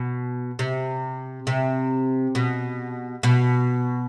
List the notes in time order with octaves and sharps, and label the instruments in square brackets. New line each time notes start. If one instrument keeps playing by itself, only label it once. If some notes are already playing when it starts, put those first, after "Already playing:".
Already playing: [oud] B2
C3
C3
B2
B2